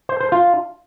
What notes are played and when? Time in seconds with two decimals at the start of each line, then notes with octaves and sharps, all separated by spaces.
0.09 C5
0.21 C5
0.32 F4